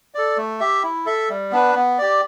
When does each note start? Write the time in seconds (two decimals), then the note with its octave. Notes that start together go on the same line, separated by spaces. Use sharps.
0.14 A4 D5
0.37 A3
0.60 G4 E5
0.83 E4
1.06 A4 E5
1.29 G3
1.52 B3 D4 B4
1.75 B3
1.98 G4 D5